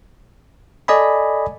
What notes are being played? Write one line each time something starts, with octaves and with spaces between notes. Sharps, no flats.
A4 D5 D#5 G#5 B5